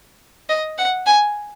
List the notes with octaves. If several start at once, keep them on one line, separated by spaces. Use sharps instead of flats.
D#5
F#5
G#5